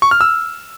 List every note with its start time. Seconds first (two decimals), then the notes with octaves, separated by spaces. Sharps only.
0.02 C#6
0.11 F6
0.21 E6